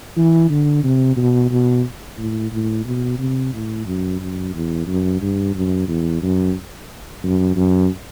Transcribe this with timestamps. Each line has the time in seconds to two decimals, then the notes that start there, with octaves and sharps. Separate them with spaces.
0.17 E3
0.50 D3
0.84 C3
1.17 B2
1.51 B2
2.18 A2
2.52 A2
2.85 B2
3.19 C3
3.53 A2
3.86 F#2
4.21 F#2
4.54 E2
4.87 F#2
5.22 G2
5.55 F#2
5.88 E2
6.22 F#2
7.23 F#2
7.56 F#2